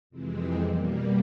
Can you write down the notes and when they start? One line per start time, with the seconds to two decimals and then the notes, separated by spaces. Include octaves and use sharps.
0.10 F2 C3 E3 G#3 C4
0.60 B2 G3 A#3